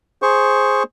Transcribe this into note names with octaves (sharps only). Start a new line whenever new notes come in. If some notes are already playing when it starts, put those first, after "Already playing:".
G#4 C5 C#6